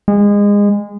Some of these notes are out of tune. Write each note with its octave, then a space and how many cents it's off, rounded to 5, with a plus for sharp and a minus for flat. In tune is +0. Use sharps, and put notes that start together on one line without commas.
G#3 -25